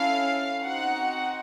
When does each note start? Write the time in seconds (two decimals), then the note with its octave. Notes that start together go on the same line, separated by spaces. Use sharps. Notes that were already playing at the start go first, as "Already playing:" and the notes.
Already playing: C#4 E4 A4 F5
0.63 C4 D#4 F#4 F#5